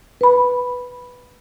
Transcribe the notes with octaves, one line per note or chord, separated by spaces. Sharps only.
B4 B5